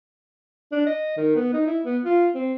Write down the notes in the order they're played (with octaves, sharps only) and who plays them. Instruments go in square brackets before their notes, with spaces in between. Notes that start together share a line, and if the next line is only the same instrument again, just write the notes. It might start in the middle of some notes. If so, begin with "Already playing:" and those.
[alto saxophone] D4
D#5
D#3
B3
D#4
E4
B3
F4
C4